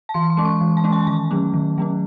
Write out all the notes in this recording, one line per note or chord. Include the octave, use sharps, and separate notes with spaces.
A5
E3 C6
C6
G#3 C#4
C#6
E3
A5
G#3 C#4
G#5
G#5
D#3 A5
F#3 A3 C#4
D#3
F#3 A3 C#4